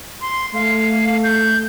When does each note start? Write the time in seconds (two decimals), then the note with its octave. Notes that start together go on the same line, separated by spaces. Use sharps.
0.21 C6
0.54 A3 F5
1.23 G6